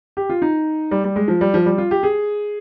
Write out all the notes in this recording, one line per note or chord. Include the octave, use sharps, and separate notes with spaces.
G4
F4
D#4
G3
G3
G#3
F3
G3
F3
G3
F4
G4
G#4